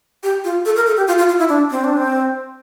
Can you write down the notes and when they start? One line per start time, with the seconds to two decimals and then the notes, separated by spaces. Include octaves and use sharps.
0.23 G4
0.44 F4
0.65 A4
0.76 A#4
0.86 A4
0.97 G4
1.07 F4
1.18 F4
1.29 F4
1.39 E4
1.49 D4
1.71 C4
1.84 D4
1.97 C4